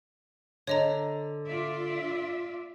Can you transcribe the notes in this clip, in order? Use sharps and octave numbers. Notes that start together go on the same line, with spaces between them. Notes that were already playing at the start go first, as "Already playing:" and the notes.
D3 C#5 D#5 A#5
F4 D5 E5